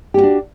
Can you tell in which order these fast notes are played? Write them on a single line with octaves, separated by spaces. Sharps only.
G4 C#4 F#4 D4